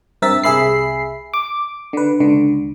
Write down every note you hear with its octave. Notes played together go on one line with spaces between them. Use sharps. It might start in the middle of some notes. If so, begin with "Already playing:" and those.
G2 C4 A#4 E5 A6 B6
C2 C3 G#4 E5 B5 C7
D6
D3 B4
C#2 D3